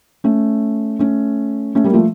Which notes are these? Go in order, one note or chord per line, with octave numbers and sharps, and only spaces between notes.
A3 C#4
A3 C#4
A3 C#4
G3 A#3
F3 A3